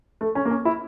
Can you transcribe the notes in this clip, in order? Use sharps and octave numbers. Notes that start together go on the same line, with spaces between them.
A3
C#4
A#3
C#4
E4